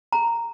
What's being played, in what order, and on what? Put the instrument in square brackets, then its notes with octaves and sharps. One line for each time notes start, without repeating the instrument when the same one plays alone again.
[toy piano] A#5